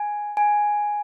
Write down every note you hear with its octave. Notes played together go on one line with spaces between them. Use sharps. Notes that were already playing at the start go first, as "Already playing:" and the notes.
Already playing: G#5
G#5